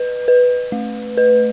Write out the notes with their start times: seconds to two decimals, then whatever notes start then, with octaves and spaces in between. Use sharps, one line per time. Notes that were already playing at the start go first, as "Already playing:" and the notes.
Already playing: B4
0.28 B4
0.72 A3
1.17 B4